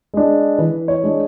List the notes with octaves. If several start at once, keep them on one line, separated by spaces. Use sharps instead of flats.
G#3 D4
E3 B4
C#5
G#3 D4